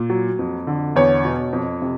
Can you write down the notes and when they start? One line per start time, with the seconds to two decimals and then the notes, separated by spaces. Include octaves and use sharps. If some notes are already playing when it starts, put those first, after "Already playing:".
Already playing: A#2
0.10 F#3
0.39 F2
0.67 D3
0.96 E2 C#5
1.25 B2
1.53 F2
1.82 C3